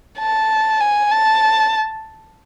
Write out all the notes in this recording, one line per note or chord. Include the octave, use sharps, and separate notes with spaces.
A5
G#5
A5